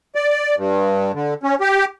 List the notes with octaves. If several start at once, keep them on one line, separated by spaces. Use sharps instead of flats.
D5
G2
D3
C#4
G4